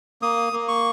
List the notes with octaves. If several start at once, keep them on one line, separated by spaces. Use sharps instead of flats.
A#3 D#6
A#3
C#6